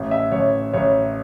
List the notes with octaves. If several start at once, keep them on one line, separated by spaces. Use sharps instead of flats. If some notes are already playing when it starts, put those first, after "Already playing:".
Already playing: A1
E5
A1 C#5
A1 C#5